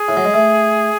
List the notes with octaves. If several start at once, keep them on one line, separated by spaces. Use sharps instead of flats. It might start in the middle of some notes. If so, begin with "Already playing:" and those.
Already playing: G#4
A2
F#3
G#3
A3